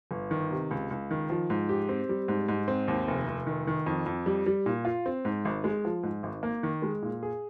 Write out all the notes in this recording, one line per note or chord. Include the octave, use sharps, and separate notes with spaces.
G1
D#3
C3
C#2
C#2
D#3
F3
G#2
G4
C4
G3
G#2
G#2
C4
D#2
F1
F1
D#3
D#3
F2
F2
G3
G3
A#2
F4
C4
G#2
G#1
G#3
F3
G#2
G#1
A#3
D#3
G#3
A#2
G#4